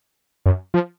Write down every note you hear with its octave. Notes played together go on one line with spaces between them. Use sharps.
F#2
F3